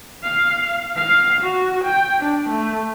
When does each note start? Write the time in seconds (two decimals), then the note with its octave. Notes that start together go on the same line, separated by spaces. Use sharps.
0.23 F5
0.97 F5
1.41 F#4
1.85 G5
2.20 D4
2.50 A3